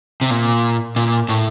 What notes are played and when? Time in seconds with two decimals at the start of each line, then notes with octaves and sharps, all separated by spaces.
0.21 C3
0.30 A#2
0.96 A#2
1.29 A2